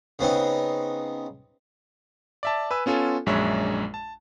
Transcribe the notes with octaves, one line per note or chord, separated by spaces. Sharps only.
C#3 B3 C4 D#4
D5 E5 A5
B4 G#5 E6
B3 C#4 F4 A4 G#5
A#1 F#2 G#3 D4 C#5 E5
A5